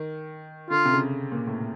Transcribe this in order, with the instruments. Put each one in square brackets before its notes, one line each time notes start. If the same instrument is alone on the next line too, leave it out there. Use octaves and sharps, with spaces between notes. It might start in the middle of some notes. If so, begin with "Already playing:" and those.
Already playing: [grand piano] D#3
[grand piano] D3 [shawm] F4
[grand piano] C3
C#3
A#2
A2